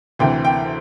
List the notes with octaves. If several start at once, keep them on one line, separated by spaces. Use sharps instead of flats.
D2 C3 E3 G5
G5